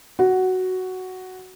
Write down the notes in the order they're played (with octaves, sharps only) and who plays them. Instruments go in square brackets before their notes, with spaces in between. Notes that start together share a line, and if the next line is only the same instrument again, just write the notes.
[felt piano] F#4